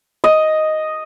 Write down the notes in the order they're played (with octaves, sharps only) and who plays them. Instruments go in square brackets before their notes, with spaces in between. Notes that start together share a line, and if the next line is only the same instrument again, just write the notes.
[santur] D#5